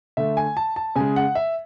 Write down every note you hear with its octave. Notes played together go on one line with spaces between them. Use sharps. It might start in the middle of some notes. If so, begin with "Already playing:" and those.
D3 A3 E5
G#5
A5
A5
C#3 G#3 G#5
F#5
E5